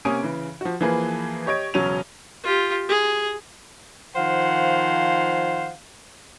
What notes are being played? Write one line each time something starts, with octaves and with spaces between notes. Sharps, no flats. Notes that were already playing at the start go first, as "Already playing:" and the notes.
C3 A#3 C#4 G#5 D#6 D7
C#3 E3
F3 F#4
E3 F3 A#3 G#4 B4
G4 C#5 D#5 G#6 D7
E1 C#3 F#3 C#4 D#7 F7
F4 G4
G#4
D#3 F3 C5 F5 F#5